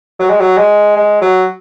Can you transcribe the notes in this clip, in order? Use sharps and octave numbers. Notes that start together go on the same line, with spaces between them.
F#3
G#3
F#3
G#3
G#3
F#3